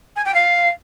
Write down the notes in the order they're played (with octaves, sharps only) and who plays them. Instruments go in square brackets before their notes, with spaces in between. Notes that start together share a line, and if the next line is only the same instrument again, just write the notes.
[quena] G#5
G5
F5